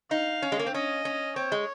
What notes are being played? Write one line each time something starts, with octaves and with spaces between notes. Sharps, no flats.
D#4 F5
C#4
G#3
A#3
C4
C#4 D#5
C#4
C4 C#5
G#3